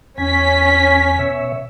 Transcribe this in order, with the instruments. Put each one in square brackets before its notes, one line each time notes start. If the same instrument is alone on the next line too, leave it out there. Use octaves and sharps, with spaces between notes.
[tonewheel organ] E2 G#5 [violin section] C#4 B6
[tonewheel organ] B2 C#5 E5